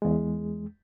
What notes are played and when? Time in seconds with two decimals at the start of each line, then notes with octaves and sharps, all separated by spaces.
0.02 E2 G#3